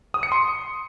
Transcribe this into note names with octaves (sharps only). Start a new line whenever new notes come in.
D#6
C#7
C6